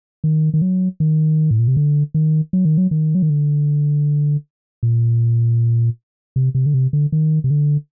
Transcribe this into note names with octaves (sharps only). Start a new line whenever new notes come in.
D#3
D#3
F#3
D#3
A2
A#2
C3
D3
D#3
F#3
D#3
F#3
D#3
F#3
D#3
D3
A#2
C3
C3
D3
C3
D3
D#3
C3
D3